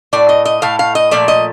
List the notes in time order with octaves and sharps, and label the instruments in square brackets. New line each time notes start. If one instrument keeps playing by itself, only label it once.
[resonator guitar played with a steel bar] A2 A3 D5
D#5
D#5
A2 A3 F5
F5
D#5
A#2 F3 A3 D5
D#5